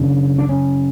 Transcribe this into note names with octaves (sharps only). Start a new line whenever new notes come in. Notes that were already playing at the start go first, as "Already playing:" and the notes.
Already playing: F#2 C#3 D4
D4
C#4